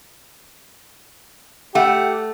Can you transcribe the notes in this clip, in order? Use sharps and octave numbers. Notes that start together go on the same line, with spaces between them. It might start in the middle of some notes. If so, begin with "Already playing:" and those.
A3 G4 F#5